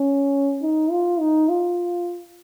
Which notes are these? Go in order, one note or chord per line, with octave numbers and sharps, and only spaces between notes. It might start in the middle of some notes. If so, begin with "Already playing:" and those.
Already playing: C#4
D#4
F4
D#4
F4